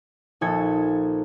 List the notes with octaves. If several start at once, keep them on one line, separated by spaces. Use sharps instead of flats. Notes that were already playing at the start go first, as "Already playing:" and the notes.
A#1 D#4 A4 G#6 C#7